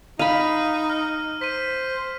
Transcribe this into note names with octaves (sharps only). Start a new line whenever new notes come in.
D#4 F5 B5 D#7
F6
C5 B6 D#7